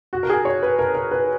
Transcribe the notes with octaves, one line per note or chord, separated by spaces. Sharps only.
F#4
A#4
G#4
C#5
B4
A#4
A#4
B4